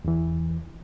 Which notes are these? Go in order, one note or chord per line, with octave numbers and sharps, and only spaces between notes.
E2 E3